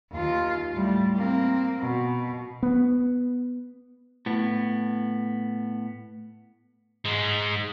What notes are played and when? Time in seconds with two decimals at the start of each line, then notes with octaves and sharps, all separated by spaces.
0.12 D#2 F4
0.74 A2 G3
1.16 A#3 C4
1.79 B2
2.63 B3
4.26 A2 B3
7.05 G#2 G#3